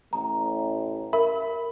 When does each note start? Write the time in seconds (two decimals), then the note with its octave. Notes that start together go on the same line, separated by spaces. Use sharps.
0.13 A1 A#5
1.13 A#4 E5 B5